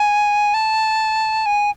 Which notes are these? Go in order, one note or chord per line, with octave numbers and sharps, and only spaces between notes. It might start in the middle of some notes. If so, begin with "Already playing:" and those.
Already playing: G#5
A5
G#5